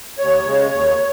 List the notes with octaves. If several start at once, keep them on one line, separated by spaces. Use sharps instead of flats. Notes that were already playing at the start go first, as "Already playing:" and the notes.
D#2 C#5
C#3 G#3
D#2